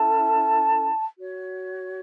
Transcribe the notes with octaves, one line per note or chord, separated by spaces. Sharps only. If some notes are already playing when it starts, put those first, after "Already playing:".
Already playing: C#4 E4 A4 A5
F#4 C#5